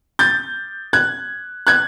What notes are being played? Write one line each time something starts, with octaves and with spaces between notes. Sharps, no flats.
G6 A6
F#6 G#6
F#6 G#6